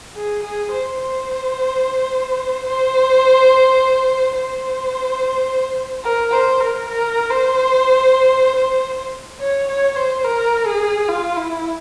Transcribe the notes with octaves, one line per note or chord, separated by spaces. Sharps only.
G#4
G#4
C5
C5
C5
C5
A#4
C5
A#4
A#4
C5
C5
C#5
C#5
C5
A#4
G#4
F4
E4